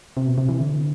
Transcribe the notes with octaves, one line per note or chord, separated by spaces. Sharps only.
C3
B2
C3
E3
D3